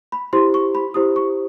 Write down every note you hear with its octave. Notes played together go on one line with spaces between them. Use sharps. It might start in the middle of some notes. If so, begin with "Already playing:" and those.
B5
E4 G4 C5 C6
C#6
B5
E4 G4 C5 D#6
C#6